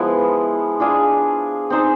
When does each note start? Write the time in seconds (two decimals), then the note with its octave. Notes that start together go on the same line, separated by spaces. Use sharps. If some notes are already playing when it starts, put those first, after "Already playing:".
Already playing: F3 G#3 B3 E4
0.80 D4 F4 G#4
1.70 C4 D#4 G#4 C5